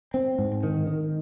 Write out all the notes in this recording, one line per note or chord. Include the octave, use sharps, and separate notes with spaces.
C4
G#2
D#3
D#3